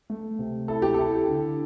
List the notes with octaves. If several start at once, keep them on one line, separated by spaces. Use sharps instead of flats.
A3
C3
E4 A4
G4
E4 A4
D3